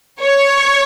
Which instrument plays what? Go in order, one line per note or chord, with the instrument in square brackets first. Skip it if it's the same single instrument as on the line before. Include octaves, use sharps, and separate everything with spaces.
[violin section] C#5